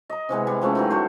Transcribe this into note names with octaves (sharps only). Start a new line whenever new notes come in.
D#5 A#5
C3 E3 G#3 B3
G3
F3 G#3 A3 C#4
D#3 E3 F#3
G3 A3 F#4 C5